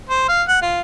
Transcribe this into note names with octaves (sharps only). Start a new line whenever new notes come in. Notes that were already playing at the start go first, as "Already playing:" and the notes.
C5
F5
F#5
F4